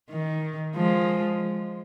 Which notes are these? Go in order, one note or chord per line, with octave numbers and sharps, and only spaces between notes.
D#3
F3 G#3